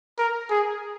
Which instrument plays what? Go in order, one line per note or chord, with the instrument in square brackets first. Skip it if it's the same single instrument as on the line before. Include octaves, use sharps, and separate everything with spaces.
[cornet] A#4
G#4